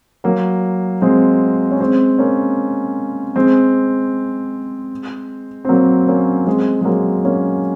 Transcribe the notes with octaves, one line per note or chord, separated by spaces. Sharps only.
F#3 A#3
G#3 C4
C#4
G#3 C4
A#3 C#4
G#3 C4
C4
F#3 A#3
A#3 C#4
G#3 C4
G#3
F#3 A#3
A#3 C#4